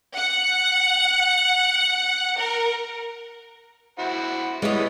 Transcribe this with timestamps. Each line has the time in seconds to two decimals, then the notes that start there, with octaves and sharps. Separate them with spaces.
0.14 F#5
2.37 A#4
3.99 E4 F#4 C5
4.62 G3 G#3 B3 E4 C#5 D#5